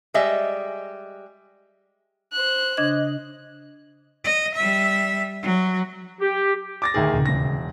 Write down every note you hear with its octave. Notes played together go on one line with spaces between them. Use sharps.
G3 G#3 D#5 E5
C5 F#6
C#3 D4 D#5 G#6
D#5
G3 E5
F#3
G4
D6 A6 A#6
D2 D#3 G#4
D#1 C#3
E1 A#6